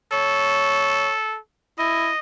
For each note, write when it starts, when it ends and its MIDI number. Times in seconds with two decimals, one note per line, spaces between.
0.12 1.38 69
0.12 1.12 73
1.78 2.09 64
1.78 2.19 75